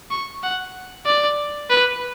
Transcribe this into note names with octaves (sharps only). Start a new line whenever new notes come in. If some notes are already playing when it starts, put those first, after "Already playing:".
C#6
F#5
D5
B4